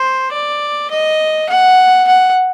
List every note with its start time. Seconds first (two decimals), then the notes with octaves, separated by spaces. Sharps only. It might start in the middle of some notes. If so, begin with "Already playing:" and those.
Already playing: C5
0.32 D5
0.90 D#5
1.49 F#5
2.07 F#5